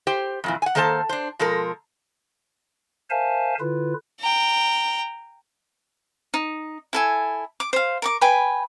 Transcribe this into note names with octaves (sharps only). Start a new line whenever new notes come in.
G4 C5 G5
F2 A#2 E3
F#5 G#5
D#3 A#3 A4 C5 D5 A5
D4 C5
B2 F3 G#3 A4 A#4
A#4 C5 E5 F5 G#5 A5
D3 E4 F4 B4
G5 A#5
D#4
E4 A4 G#5
D6
C5 F5
A#4 C#6 D6
B4 G5 G#5 B5